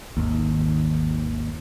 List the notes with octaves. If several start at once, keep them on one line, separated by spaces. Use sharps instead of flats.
G#1 D#2